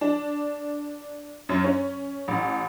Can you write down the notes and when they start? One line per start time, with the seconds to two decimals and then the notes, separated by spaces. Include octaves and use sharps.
0.01 D4
1.49 F#2
1.64 C#4
2.28 A1